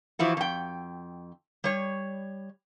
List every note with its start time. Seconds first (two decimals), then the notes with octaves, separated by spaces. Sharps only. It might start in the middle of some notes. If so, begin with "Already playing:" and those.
0.19 E3 F3 E4 F#4
0.37 F2 G5
1.64 G3 C#5